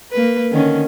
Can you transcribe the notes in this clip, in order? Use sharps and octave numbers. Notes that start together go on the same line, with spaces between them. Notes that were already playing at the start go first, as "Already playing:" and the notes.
A#3 B4
D3 D#3 C#4